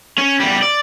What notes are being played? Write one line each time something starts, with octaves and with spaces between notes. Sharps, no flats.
C#4
E2 G3
D5